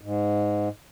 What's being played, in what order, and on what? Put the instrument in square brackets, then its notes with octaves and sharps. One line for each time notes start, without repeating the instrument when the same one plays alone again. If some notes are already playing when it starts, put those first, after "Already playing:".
[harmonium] G#2